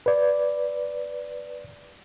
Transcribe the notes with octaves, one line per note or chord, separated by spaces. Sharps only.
B4 D5